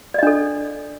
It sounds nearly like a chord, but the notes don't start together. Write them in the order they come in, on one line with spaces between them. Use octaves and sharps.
D5 D#5 D4 A4